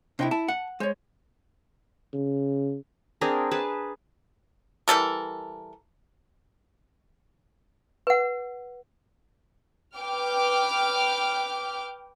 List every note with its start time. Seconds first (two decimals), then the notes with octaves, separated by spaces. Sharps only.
0.19 C3 D4 E4 D#5 G5
0.31 E4 A5
0.48 F#5
0.80 G#3 C5 C#5
2.13 C#3
3.21 C4 D4 G#4 A#4
3.51 G#4 B4 A5 D6
4.88 E3 G3 A4 A#4
8.07 B4 F#5
9.98 B4 G5 D6 F6